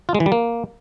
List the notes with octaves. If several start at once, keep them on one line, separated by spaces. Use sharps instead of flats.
F4
G#3
E3
G3
A#3